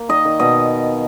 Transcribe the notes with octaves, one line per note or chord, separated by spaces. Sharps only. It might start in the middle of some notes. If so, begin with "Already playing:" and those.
Already playing: A#3
D#3 D#5
D#3
B2 D#5